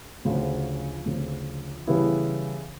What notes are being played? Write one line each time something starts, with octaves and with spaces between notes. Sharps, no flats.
D2 C#3 F3
D2 C#3 F3
C#3 E3 G3 B3 E4